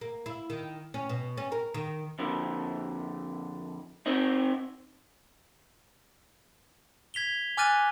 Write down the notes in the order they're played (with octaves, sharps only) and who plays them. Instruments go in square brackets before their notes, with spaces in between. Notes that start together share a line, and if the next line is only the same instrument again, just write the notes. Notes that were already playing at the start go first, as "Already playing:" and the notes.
[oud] A#3
E4
D#3
C#4
B2
C#4
A#4
D#3
[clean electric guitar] F2 D3
C4 D#4
[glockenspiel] G#6 B6 F7 G7
G#5 D6 F6 F#6 A6 D#7